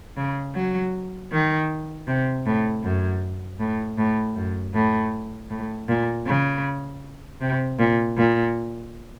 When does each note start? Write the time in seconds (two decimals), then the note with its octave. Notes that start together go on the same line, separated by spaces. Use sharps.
0.17 C#3
0.55 F#3
1.32 D#3
2.07 C3
2.45 A2
2.83 F#2
3.59 A2
3.98 A2
4.36 F#2
4.74 A2
5.50 A2
5.88 A#2
6.27 C#3
7.41 C3
7.79 A#2
8.17 A#2